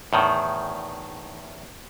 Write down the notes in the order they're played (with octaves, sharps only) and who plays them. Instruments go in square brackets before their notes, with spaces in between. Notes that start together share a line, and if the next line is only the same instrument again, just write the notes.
[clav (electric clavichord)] E2 A2 D#3